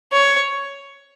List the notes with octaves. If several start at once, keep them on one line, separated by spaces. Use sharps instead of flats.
C#5